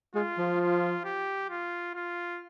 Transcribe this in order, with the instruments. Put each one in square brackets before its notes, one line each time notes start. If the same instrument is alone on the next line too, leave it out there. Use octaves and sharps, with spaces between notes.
[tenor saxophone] G#3 [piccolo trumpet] F4
[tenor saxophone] F3
[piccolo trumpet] F4
G4
F4
F4